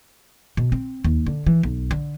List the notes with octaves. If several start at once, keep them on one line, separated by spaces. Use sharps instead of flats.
B2
C4
D#2
D3
E3
B1
D3